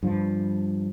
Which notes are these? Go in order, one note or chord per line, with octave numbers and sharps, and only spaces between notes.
G2 F3